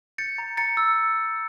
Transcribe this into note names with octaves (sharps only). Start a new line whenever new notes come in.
G6 A6 C#7
A#5
A#5 A6 C#7
E6